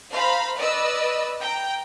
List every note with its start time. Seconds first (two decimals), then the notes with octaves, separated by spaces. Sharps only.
0.11 C5 F5 A#5 B5
0.56 B4 D5 D#5 E6
1.39 G5 A#5